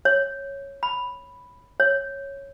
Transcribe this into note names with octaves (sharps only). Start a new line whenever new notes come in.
C#5
B5
C#5